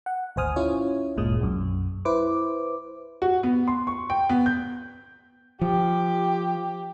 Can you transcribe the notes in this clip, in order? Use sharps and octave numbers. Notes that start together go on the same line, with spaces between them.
F#5
G#1 D2 C5 G#5 D#6 F6
C#4 E4 F4 C#5
G1 D2 A#2 G#3 D#6
B1 F#2
E4 B4 C5 D6
F#4
B3
C6
C#6
G5
B3
G6
F3 G4